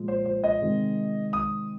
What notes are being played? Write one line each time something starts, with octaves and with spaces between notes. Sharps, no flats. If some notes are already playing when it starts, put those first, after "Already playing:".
Already playing: A#2 F3 G#3
C5
C5
D#5
C3 D#3 G#3
D#6